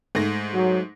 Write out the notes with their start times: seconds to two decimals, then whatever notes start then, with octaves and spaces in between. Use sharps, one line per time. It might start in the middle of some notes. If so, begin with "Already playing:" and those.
0.15 G#2 A3 A#6
0.53 F#3